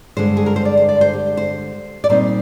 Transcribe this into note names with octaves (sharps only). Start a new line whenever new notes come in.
G2 D3 G#3 D4 C5
G#4
A#4
C5
D5
C5
D5
C5
G4
C5
D5
A#2 G3 C4 D#4 C5